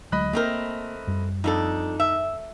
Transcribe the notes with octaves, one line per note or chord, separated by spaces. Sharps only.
D2 F#3 G#3 D#5 B5 F#6
A3 A#3 C4 A#4
F#2 G3
F2 D4 D#4 A4
E5